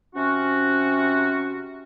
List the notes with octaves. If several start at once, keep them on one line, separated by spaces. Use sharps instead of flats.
C3 C#4 F#4